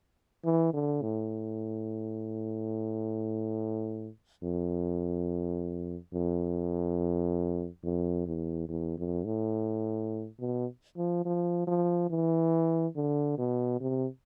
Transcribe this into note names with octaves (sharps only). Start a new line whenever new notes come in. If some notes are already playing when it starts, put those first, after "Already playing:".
E3
D3
A2
F2
F2
F2
E2
E2
F2
A2
B2
F3
F3
F3
E3
D3
B2
C3